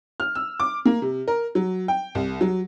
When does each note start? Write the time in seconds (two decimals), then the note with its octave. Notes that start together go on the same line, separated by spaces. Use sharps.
0.20 F6
0.35 E6
0.60 D6
0.85 A#3
1.02 C3
1.28 A#4
1.55 F#3
1.88 G5
2.15 C2
2.41 F#3